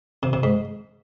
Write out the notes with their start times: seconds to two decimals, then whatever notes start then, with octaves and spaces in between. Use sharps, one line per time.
0.23 C3
0.33 C3
0.43 G#2